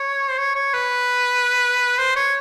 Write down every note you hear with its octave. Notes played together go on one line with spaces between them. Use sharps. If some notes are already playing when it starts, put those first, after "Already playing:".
Already playing: C#5
C5
C#5
C#5
B4
C5
C#5